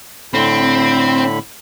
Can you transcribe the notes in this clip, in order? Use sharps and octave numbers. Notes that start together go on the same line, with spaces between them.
A2 D3 C4 B5